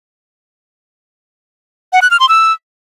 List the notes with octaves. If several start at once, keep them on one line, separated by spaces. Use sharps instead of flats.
F#5
F#6
F6
C6
E6